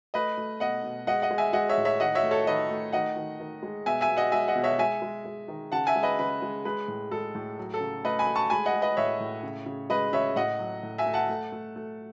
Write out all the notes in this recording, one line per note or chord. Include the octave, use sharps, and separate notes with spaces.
A3 B4 D#5
A3
B2 D#5 F#5
B2
G#3 D#5 F#5
D#5 F#5
G#3
E5 G#5
G#3 D#5 F#5
C#5 E5
A2
C#5 E5
D#3 D#5 F#5
C#5 E5
A3
A4 C#5
D#3 B4 D#5
A3
D#3 D#5 F#5
D#3
D#3
G#3
B2 E5 G#5
E5 G#5
B2
D#5 F#5
G#3 E5 G#5
D#5 F#5
B2
C#5 E5
G#3 E5 G#5
G#3
G#3
D#3
C#3 F#5 A5
E5 G#5
G#3
B4 D#5
C#3 B4
G#3
G#3 B4
A2
G#3 A4
A2
F#3
A4
C#3
A3 B4 D#5
G#5 B5
A3
A5 C#6
G#3 G#5 B5
D#5 F#5
G#3
B4 D#5
A2 C#5 E5
A2
C#3
C#3
G#3 B4 D#5
C#3 C#5 E5
A2 D#5 F#5
F#3
A2
E5 G#5
A3
F#5 A5
A3
A3
A3